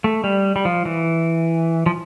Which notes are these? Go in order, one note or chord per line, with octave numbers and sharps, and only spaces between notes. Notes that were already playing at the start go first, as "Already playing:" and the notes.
A3
G3
G3
F3
E3
F3